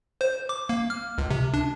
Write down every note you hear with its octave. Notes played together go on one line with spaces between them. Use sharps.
C5
D6
A#3
F6
C#2
C3
D4